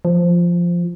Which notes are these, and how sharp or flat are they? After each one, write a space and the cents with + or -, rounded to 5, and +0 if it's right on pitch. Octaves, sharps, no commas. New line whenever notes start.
F3 -5